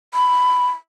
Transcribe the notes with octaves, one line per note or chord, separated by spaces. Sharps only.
B5